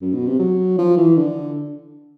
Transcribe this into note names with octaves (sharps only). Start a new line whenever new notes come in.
F#2
B2
C3
F#3
F3
E3
D3